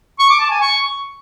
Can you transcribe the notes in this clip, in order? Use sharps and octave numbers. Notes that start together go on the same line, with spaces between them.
C#6
D6
A5
G#5
C#6